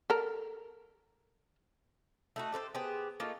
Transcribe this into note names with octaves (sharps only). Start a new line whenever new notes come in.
A4 A#4
A3 D#4 F#4
G4 A4 B4 C5
B3 G4 G#4 C5
A3 A#3 D#4 F4